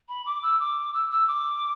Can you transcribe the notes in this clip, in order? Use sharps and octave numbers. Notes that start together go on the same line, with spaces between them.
B5
D6
E6
D6
E6
E6
D6